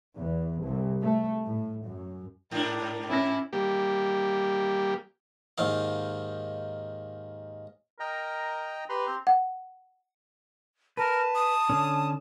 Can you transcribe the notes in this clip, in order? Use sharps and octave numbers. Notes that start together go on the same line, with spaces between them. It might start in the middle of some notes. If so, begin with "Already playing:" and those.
E2
C2
A3
A2
F#2
G#2 D4 A#4
C#4 E4 A#6
G3 A#3 G4
D#2 G#2 D#3 F5
A#4 D#5 G5 A#5
G4 B4 A#5 C6
C4
F#5
A#4 B4 A5
D#6
D3 C#4